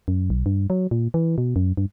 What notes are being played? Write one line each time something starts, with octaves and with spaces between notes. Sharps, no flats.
F#2
B1
G2
F#3
A#2
E3
B2
F#2
G2